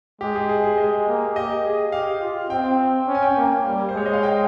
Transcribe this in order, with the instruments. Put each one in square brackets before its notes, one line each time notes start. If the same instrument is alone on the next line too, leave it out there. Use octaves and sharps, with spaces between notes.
[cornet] G#3 [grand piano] G4
[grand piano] G#4
G#4
G#4
[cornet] G#3 [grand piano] D#5
[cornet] A#3
[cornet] G4 [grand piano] D#5
[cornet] G#4
[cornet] G4 [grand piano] F5
[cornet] F4
[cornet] C4 [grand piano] G5
[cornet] C#4
[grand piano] G#5
G5
G#5
[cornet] A#3
G3
[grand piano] C5
[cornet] G#3 [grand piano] C#5
[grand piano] D#5
F5
G5